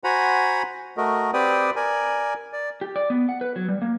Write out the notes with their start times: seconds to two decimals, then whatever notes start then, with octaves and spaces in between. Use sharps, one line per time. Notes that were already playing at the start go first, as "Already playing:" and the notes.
0.04 F#4 C5 F#5 G#5 A#5 B5
0.97 A3 F#4 A#4 D#5
1.33 C4 G4 B4 D5 G5 D#6
1.76 A#4 D5 G#5
2.53 D5
2.81 G4
2.96 D5
3.10 B3
3.29 F#5
3.41 B4
3.56 F#3
3.68 G3
3.82 A#3